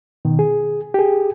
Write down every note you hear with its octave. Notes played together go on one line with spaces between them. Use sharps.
B2 D#3
G#4
G4 G#4